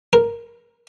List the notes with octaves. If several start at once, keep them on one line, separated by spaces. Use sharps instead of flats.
A#4